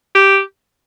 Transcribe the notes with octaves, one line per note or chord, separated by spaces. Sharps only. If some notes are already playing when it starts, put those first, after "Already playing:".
G4